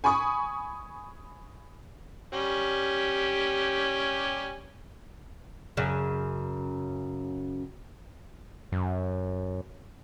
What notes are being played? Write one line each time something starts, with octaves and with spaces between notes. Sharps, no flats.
G#5 B5 C#6 D#6
G3 C#4 G4
F#2 C#3
F#2